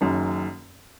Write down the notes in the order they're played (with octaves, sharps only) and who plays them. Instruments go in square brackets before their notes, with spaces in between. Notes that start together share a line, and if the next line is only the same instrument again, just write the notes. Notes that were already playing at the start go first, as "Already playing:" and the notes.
[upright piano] F#1 F#2 D#3